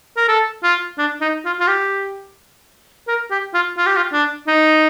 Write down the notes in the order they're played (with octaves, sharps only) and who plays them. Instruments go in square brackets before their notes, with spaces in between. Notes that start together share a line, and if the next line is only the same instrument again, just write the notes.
[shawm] A#4
A4
F4
D4
D#4
F4
F4
G4
A#4
G4
F4
F4
G4
F4
D4
D#4